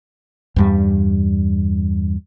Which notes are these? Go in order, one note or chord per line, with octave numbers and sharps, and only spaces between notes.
E2 G2 G3